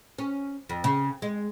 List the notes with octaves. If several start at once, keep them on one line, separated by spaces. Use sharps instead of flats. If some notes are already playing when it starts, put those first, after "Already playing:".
C#4
F2
C#3
G#3